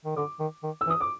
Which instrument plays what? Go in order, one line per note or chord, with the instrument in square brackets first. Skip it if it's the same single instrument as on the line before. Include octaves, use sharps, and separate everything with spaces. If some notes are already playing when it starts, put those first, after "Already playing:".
[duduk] D#3
[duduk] D3 [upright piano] D6
[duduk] D#3
D#3
[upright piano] E6
[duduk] E3
[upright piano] D#6
D6